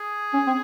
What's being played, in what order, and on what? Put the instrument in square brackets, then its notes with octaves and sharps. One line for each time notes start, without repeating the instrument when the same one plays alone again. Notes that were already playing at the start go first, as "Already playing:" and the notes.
Already playing: [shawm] G#4
[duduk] C#4
C4